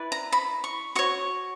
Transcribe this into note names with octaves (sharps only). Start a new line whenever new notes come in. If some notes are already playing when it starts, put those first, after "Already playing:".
Already playing: E4 B4 D5
A#5
B5
C#6
F#4 C#5 C#6